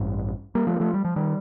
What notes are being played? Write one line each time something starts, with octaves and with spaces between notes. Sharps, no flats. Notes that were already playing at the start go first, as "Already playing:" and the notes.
Already playing: A1 G2
G3 A#3
F3 A3
A#3
F3 A3
G3
F3
D#3 G3